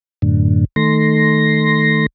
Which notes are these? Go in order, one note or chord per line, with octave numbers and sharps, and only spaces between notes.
F#2 A2 D3
D#3 A3 C6 A#6